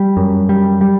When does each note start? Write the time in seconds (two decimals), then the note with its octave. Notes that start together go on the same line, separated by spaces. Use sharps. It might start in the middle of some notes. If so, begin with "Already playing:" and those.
Already playing: G3
0.17 F#2
0.49 G3
0.81 G3